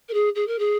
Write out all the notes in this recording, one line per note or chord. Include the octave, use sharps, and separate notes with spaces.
A#4
G#4
G#4
A#4
G#4